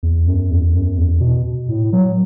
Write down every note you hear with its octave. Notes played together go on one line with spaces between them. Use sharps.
E2
F#2
E2
F#2
E2
B2
A2
F#3